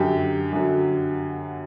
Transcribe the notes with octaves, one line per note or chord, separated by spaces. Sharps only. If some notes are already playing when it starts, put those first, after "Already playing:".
Already playing: F#2 D3 F#3 G4
F#2 D3 F#3